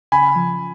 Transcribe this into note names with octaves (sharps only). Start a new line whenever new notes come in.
C#3 G#5 B5
F3